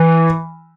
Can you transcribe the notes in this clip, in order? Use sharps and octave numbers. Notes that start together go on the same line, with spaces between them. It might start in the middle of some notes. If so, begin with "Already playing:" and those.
Already playing: E3